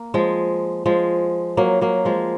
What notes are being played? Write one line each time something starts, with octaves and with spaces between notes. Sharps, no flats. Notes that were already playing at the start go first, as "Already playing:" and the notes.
Already playing: A#3
F3 G#3
F3 G#3
F#3 A#3
F#3 A#3
F3 G#3